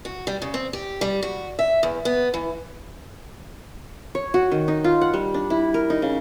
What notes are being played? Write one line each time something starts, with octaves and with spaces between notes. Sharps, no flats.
F#4
G3
C#3
C4
G4
G3
F#4
E5
E2
B3
E3
C#5
F#4
D#3
D#4
F4
F#5
G3
D4
E4
A#4
D#4
C#3